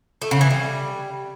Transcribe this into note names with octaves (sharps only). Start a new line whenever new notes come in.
A3
C#3
E3
G3